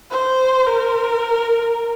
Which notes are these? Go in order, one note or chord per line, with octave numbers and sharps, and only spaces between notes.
C5
A#4